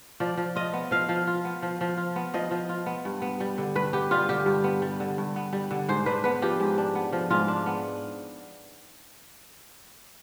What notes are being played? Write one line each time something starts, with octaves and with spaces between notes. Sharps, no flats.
F3 D5
F3
F4 D#5
B3
F3 F5
F3
F4
B3
F3
F3
F4
B3
F3 D#5
F3
F4
B3
G2
B3
G3
D3
G2 B4
B3 G4
G3 F4
D3 G4
G2
B3
G3
D3
G2
B3
G3
D3
G#2 C5
D4 B4
B3 B4
F3 G4
G#2
D4
B3
F3
G#2 F4
D4
B3